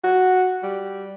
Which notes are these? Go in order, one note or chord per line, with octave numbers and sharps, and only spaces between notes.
F#4
G3